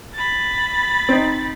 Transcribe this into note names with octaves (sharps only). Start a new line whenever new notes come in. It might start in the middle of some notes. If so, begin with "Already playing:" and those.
B5 A6
C4 D#4